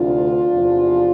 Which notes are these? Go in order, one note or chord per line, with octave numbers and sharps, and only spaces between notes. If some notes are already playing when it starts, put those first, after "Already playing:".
Already playing: D2 C3 E3 D4 F4
E2 C3 F3